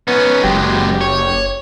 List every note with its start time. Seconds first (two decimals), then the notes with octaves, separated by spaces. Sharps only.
0.08 B3 C#4 D#4
0.44 F#1 F#3 G#3 G4
1.01 C#5